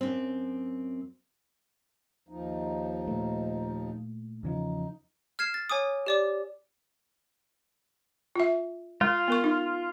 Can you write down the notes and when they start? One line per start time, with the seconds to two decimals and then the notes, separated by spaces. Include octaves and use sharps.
0.01 F#2 C4
2.29 D#2 F3 D#4
3.08 A#2 A3
4.43 E2 C#3 F3 D#4
5.39 F6 G#6 C7 E7
5.54 A6
5.70 C#5 G#5 D6 D#6
6.06 G4 D5 D6
8.36 F4 E5
9.01 G#3 F4
9.28 B3 A#4 C#6
9.44 D#4